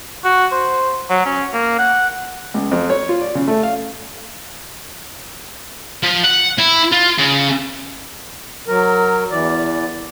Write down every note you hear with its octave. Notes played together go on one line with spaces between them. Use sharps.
F#4
C5
F#3
C#4
A#3
F#5
C#2
F2
C#5
F4
D5
C#3
A3
F5
F3
F#5
E4
F4
C#3
F#3 A#4
E2 E3 D5